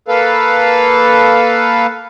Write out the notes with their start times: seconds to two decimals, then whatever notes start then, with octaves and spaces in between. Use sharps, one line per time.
0.08 A#3 A4 B4 F5